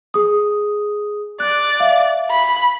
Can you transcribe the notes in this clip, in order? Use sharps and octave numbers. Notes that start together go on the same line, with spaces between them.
G#4 D#6
D5 F#6
E5 F5
B5